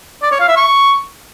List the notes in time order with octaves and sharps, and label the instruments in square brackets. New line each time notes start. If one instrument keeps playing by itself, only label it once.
[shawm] D5
C#5
F5
E5
C#6